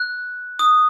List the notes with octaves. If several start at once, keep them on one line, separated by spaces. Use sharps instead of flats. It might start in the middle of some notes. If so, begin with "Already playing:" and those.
Already playing: F#6
D#6